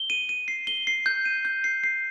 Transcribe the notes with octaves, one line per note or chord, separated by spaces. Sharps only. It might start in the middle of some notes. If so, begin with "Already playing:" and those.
Already playing: G7
D#7
D#7
C7
G7
C7
G6
D#7
G6
C7
C7